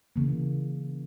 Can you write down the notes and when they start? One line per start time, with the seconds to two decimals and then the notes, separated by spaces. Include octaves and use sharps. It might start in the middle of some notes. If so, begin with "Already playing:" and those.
0.16 C#3 E3 A#3